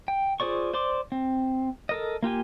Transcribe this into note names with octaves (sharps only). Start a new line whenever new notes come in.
G5
F4 G#4 C5 D5 C#6
C5 D5 C6 D6
C4
A4 A#4 D#5
A#3 F4 G4 G#5